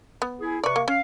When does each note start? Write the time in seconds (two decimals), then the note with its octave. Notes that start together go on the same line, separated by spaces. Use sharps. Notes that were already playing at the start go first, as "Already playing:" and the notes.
0.22 B3
0.41 E4 G#4
0.64 C3 B4 D5 C#6
0.76 A#3
0.88 C#4 F5